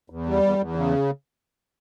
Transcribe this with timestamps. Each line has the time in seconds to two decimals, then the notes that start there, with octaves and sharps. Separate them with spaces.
0.10 E2
0.26 G3
0.43 E2
0.58 E2
0.75 C#3